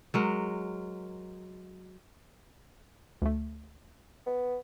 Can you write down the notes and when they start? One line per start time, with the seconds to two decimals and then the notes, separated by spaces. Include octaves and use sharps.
0.14 F#3 G#3 A#4
3.22 D2 A3
4.26 B3